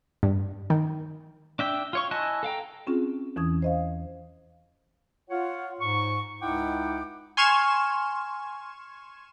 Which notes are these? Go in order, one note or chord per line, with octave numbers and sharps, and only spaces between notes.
G2
D#3
D4 E5 G5
F4 C#5 C#6
E4 D#5 G#5 A5 F#6
A4 F5 G5 A#5
C4 C#4 F4 G#4
E2 E3 C#4 D#6 G#6
C5 D#5 F5
F4 C#5 F#5
G#2 C#6
C#2 D#4 E4 F#5 G5 D6
G#5 C6 C#6 F6 G#6 E7